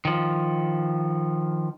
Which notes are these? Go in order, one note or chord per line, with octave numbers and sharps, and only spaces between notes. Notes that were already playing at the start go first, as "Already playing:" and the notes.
D#3 F3